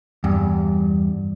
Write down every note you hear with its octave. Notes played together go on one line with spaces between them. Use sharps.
E2 G2